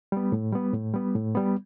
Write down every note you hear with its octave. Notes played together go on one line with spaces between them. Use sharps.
G3 B3
A2
G3 B3
A2
G3 B3
A2
G3 B3